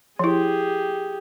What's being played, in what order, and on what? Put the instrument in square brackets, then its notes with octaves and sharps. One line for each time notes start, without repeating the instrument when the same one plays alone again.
[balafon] F3 E4 [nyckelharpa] G4 G#4